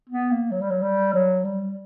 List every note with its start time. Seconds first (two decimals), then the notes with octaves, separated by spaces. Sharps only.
0.09 B3
0.31 A#3
0.52 F#3
0.61 G3
0.71 F#3
0.83 G3
1.14 F#3
1.45 G3